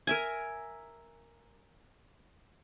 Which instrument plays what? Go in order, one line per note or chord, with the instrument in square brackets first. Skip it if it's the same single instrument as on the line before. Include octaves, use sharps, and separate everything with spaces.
[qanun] A#4 E5 G#5